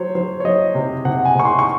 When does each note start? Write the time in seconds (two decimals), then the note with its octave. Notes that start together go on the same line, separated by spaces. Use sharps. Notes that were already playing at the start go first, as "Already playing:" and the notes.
Already playing: F#3 C5 C#5
0.15 F#3 C5
0.40 C#5
0.45 F#3 D#5
0.75 C3
1.05 C3 F#5
1.25 G#5
1.36 C3 C#6
1.45 C6
1.59 C#6